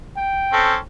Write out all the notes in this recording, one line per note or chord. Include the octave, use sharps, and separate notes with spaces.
G5
C4 C#4 A4